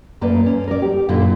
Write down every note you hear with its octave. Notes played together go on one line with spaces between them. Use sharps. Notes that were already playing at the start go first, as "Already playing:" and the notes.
F#2 A3 A#3 B4 D5
C#4
A#4 D5
G4
F#2 A#2 D3 A#3 E4 F4